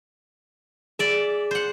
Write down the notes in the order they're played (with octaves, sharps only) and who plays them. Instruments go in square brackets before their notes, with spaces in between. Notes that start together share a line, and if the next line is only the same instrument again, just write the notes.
[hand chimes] G#4 [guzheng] D5 E5
[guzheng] C5 F#5